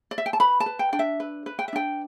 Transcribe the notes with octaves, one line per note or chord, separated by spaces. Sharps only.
D5
E5
G5
A5
B4 B5
A5
B4
G5
D4 G5
E5
B4
B4
G5
E5
D4 G5